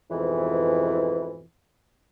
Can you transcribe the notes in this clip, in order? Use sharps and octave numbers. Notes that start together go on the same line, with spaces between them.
F2 G#2 B2 E3